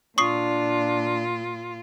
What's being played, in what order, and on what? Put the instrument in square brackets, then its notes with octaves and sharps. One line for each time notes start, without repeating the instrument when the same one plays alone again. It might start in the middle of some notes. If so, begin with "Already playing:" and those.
[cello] A#2 F4 [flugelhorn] D4 [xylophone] C#6 D#6 C7